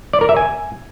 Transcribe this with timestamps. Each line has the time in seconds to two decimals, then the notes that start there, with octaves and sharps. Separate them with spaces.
0.13 D5
0.21 A#4
0.29 E5
0.37 G#5